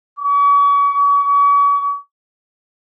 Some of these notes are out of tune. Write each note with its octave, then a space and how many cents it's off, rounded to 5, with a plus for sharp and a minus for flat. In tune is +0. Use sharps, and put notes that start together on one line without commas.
C#6 +40